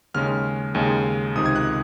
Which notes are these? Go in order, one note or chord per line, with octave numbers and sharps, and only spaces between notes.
D#2 C#3 G#3 C#4 F6
D#2 C#3 G#3 C#4
C#2 C3 D#3 D#6
G#6
F#6